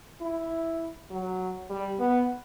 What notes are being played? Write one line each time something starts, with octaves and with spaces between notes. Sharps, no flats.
E4
F#3
G3
B3